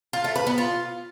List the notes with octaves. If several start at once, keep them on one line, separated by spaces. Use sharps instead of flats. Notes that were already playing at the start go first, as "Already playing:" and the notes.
F4
A3
B4
B3
F4